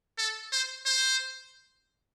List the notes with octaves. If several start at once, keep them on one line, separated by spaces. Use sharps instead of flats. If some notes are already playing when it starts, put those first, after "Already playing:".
A4
C5
C5